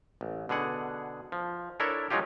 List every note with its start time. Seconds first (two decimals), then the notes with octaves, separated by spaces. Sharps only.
0.21 A1
0.49 B2 D3 G#4 F#5
1.32 F3
1.80 D4 E4 A4 A#4 C#5 E5
2.11 F#3 G#3 C#4 D#4 F4 G4